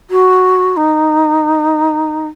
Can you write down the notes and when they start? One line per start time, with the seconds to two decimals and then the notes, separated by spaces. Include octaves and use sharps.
0.10 F#4
0.77 D#4